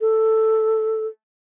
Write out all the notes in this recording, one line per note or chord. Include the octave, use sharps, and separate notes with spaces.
A4